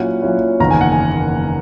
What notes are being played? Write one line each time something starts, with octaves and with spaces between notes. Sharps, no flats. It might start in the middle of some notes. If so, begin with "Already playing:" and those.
Already playing: A#2 F#3 C#4 E4 F#5
A#2 F#3 C#4 E4
F#1 E2 D#3 A#3 A#5
G#5
F#5
G#5